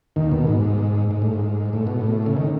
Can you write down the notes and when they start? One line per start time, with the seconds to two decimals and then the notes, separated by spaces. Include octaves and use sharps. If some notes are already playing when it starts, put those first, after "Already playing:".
0.16 D#2 D#3
0.32 B2
0.47 G#2
1.11 G#2
1.22 A2
1.34 G#2
1.73 A2
1.87 B2
2.01 A2
2.26 C#3
2.37 D#3